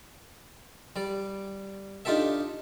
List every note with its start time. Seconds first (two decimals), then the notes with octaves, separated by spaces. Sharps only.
0.96 G3 D5
2.05 D4 D#4 F4 G4 A4 E5